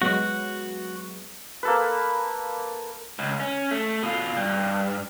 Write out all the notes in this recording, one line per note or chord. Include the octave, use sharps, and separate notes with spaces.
F#3 G#3 B3 F#4
A#3 A4 B4
C#2
C#4
A3
B2 F4
G2